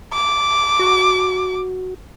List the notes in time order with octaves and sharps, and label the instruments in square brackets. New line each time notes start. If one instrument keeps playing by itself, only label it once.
[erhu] D6
[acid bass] F#4